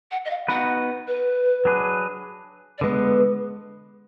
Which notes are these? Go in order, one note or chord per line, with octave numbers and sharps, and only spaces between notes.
F#5
D#5
F5
B3 D#4 F#4 B4 F#5
B4
F#3 D4 G#4 B4
D5
D3 G#3 B3 B4